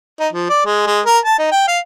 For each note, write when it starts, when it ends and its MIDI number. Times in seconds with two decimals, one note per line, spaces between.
0.20 0.28 63
0.33 0.49 53
0.49 0.64 74
0.66 0.86 56
0.87 1.01 56
1.06 1.18 70
1.25 1.37 81
1.39 1.49 63
1.51 1.66 79
1.68 1.79 77